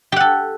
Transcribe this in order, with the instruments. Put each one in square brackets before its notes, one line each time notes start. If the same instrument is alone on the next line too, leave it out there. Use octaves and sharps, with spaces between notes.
[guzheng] G4
F#5
A4